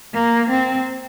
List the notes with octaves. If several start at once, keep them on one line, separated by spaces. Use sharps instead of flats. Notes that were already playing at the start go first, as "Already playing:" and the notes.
A#3
C4